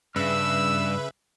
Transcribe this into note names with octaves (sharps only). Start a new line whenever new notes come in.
G2 C#3 B4 E5 E6